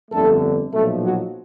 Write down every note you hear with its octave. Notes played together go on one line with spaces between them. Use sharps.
G1 F2 D3 A3 A4
B1 A#2 F3 A3 A4
F#3 F#4